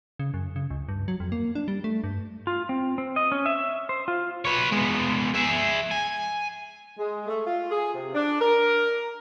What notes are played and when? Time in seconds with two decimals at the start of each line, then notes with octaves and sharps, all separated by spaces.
0.19 C#3
0.34 F#2
0.56 C#3
0.70 C#2
0.89 G2
1.08 F#3
1.20 F2
1.32 A#3
1.55 D4
1.68 G3
1.84 A3
2.04 G2
2.47 F4
2.69 C4
2.98 C4
3.16 D#5
3.32 C#4
3.46 E5
3.89 C5
4.08 F4
4.45 B4 C#5
4.72 G#3 B3
5.34 G#4 E5
5.91 G#5
6.99 G#3
7.27 A3
7.46 F4
7.71 G#4
7.95 C3
8.15 D4
8.41 A#4